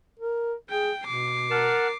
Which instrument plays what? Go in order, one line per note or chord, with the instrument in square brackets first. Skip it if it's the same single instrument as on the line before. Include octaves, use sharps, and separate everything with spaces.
[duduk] A#4
[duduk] G#4 [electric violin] G5
[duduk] B2 [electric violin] D6 C7
[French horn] A#4 [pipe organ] F#5 A5 F6